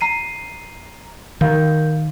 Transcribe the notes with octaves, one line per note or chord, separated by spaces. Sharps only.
A#5 C7 D#7
D#3 A#4 F5 G6